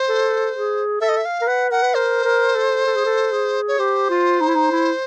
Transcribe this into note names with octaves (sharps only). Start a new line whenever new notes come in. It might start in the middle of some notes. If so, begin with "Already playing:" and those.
Already playing: C5
A4
G#4
A4 E5
D#5
E5
F5
A#4
B4 F#5
A#4 F#5
B4
A#4 C5
A#4
A4
A4
G#4
A4
G#4
C#5
G4 C5
F4
D#4
E4
D#4
E4